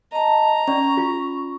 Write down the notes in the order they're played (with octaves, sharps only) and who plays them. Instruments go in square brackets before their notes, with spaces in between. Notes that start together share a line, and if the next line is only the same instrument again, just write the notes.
[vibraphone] D#5 A5 [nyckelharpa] A#5
[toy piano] C#4 D5 [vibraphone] C#6
[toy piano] F4